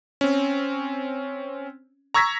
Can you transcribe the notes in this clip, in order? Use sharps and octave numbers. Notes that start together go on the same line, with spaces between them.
C4 C#4
A#5 C#6 E6 G#6 A#6 B6